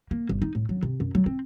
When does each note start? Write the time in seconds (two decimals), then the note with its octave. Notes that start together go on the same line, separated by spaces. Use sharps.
0.11 A#3
0.29 G1
0.42 D#4
0.55 A2
0.69 F#3
0.83 C3
1.00 F#2
1.15 F#3
1.26 C4